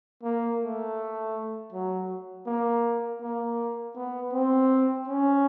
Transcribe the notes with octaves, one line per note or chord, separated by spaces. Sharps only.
A#3
A3
F#3
A#3
A#3
B3
C4
C#4